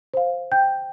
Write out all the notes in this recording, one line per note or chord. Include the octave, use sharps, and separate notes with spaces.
C5 F5
G5 G6